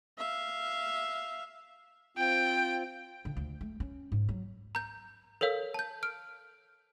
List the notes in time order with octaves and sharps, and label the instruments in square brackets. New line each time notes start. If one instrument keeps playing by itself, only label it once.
[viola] E5 F5
[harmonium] C4 F4 [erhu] G5
[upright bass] D3
D2
A3
C#4
G#2
F#3
[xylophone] A#5 G6
A4 A#4 C#5 F5 E6
A5 G6
F6 D7